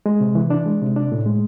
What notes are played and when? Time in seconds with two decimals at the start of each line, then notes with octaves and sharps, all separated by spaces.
0.06 G#3
0.21 C3
0.35 E3
0.50 D4
0.66 G#3
0.82 C3
0.96 D4
1.12 A2
1.26 G#3